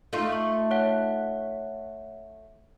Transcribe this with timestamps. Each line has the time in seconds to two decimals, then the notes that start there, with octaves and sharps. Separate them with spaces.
0.13 A3 D#4 F4
0.32 C#6
0.71 C#5 F#5